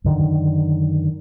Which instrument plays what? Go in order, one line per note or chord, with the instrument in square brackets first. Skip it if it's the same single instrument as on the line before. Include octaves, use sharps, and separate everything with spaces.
[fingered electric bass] F#2 D3 D#3